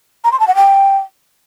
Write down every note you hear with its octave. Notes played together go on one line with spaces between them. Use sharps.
A#5
C6
A5
F#5
G5